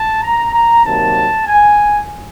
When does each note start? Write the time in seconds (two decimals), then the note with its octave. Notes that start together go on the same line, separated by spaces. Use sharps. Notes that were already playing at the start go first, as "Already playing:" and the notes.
Already playing: A5
0.22 A#5
0.53 A#5
0.84 C3 D#3 F#3 A#3 A5
1.47 G#5